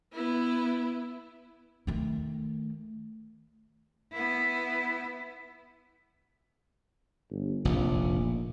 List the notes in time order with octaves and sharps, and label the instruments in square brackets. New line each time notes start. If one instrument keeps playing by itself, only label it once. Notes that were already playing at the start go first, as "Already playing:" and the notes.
[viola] B3 E4
[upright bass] D#3 A3
[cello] B3 E4
[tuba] G1
[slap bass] F1 A#1 [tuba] A#2